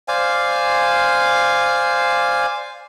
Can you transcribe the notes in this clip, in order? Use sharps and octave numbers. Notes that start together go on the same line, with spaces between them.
C5 D5 F5 G#5